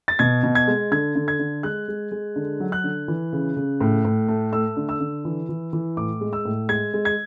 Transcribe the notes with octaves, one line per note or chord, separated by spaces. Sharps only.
A6
B2 G#6
B2
G#6
G#3
D3 G#6
D3
G#6
D3
G#3 F#6
G#3
G#3
D3
F#3
F#6
D3
E3
C#3
C#3
A2
A2
A3
A3 E6
D3
E6
D3
E3
E3
E3
A2 D6
G#3
E6
A2
G#3 G#6
G#3
G#6